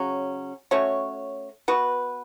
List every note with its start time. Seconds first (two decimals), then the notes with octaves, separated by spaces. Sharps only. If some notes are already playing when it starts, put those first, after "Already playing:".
Already playing: C#3 F#3 C#4
0.71 A3 C#4 F#4 C#5
1.68 B3 F#4 B4